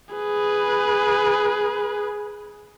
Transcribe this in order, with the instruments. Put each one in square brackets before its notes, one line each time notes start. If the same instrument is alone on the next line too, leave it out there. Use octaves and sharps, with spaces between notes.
[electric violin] G#4 B4